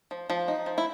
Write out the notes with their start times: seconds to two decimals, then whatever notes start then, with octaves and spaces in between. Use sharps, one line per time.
0.11 F3
0.30 F3
0.48 D#4
0.66 F3
0.78 E4